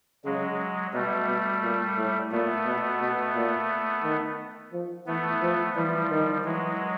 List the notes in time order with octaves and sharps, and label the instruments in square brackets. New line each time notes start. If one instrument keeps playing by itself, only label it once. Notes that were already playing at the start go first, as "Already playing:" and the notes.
[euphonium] C#3 [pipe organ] F#3 G#3
[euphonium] B2 [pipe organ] G3 A3
[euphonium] B2
A#2
A2
[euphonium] A#2 [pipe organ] A3 B3
[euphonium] B2
B2
A#2
D#3
F3
[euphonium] E3 [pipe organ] A3 B3
[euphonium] F3
[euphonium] E3 [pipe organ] F3 G3
[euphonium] D#3
[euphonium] E3 [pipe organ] F#3 G#3